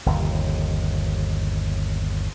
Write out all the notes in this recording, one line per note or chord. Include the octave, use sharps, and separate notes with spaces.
G1 D#2 C3